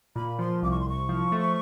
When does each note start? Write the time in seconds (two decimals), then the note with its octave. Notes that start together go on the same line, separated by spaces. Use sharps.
0.16 A#2 B5
0.39 F3 C6
0.62 C2 D6
0.71 C#6
0.80 C6
0.86 C2 C#6
1.09 F3
1.32 A3